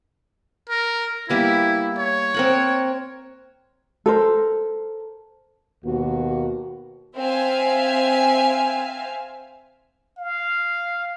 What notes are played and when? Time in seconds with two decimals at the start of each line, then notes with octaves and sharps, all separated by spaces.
0.70 A#4
1.30 G3 A#3 B3 E4
1.99 C#5
2.34 C4 A#4 F#5
4.06 A4 A#4 C5
5.84 D#2 B2 A#3 F#4
7.16 C4 E5 F5 G#5
10.18 F5